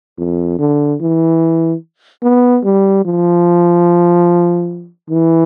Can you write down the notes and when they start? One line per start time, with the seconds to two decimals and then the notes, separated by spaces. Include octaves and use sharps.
0.18 F2
0.59 D3
1.01 E3
2.22 B3
2.64 G3
3.05 F3
5.10 E3